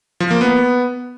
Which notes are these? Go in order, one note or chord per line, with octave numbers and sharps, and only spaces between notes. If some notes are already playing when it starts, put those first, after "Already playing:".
F3
A#3
B3